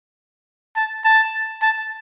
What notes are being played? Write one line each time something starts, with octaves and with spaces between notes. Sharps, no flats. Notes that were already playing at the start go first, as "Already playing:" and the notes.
A5
A5
A5